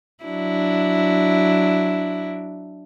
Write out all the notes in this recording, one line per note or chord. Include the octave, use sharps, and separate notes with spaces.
F#3 D4 E4